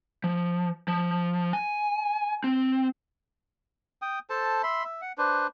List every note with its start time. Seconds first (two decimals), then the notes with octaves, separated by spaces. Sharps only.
0.24 F3
0.88 F3
1.53 G#5
2.44 C4
4.02 G5 D#6
4.30 A4 C5 A5
4.63 E5 B5 C6
4.84 E5
5.01 F#5
5.18 D4 B4 C5